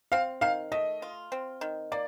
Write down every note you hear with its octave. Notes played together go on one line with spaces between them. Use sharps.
C4 F5
D#3 F5
A3 D#5
F4
C4
D#3
A#3 D5